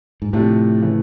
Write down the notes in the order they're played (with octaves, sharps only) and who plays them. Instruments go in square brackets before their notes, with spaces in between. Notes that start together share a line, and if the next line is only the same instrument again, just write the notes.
[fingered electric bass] G#2
[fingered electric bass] A2 [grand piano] C3 F3 A3 D4
[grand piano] C#3 E3 A3